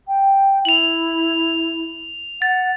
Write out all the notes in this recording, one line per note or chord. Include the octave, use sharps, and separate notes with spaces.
G5
E4 F7 F#7
F#5 A6